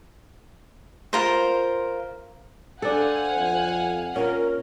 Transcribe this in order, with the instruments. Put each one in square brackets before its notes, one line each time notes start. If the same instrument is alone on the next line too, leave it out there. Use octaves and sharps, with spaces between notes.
[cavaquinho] F4 A#4 C5
[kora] D4 A4 [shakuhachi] C5 [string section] F5 F#5 G#5
[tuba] F2
[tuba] A#2 [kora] C#4 [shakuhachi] A#4